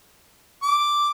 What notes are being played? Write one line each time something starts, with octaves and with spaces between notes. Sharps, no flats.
D6